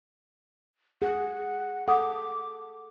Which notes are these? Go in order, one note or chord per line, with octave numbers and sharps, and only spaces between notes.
G#4 F#5
A4 F#5 D6 D#6